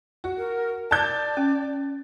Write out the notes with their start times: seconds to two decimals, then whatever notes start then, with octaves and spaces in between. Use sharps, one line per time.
0.24 F#4
0.37 A#4
0.91 D5 A5 G6
1.37 C#4